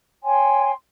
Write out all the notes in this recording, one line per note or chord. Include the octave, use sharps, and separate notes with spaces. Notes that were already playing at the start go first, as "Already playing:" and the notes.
C#5 G5 G#5 C6